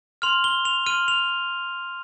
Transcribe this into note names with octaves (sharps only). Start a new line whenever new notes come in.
C6 F6 F7
G7
F7
C6 F6 D#7
F7